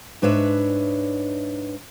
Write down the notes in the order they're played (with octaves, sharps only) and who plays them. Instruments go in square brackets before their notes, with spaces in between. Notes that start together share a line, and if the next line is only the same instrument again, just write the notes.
[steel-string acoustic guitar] G#2 D4 B4 C#5 E5